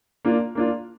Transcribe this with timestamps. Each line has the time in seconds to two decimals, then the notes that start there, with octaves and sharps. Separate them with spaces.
0.25 A#3 D4 F4
0.55 A#3 D4 F4